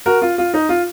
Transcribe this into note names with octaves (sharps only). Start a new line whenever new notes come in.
F#4 A#4
F4
F4
D#4
F4